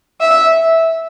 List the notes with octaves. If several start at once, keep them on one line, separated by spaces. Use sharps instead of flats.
E5